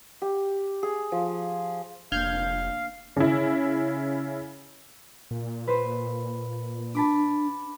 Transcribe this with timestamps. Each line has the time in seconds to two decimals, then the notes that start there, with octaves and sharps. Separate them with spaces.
0.22 G4
0.83 G#4
1.12 F3
2.12 F1 A#3 D4 F5 F6 G6 G#6
3.16 C#3 E4
5.31 A#2
5.67 B4 C5
6.95 D4 A5 B5 D6